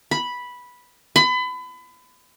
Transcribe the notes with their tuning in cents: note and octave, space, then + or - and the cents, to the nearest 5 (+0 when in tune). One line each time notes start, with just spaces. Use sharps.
B5 -5
B5 +30